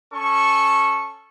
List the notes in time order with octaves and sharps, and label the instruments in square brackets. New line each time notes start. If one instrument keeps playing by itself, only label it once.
[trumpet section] C#4 A4 C#6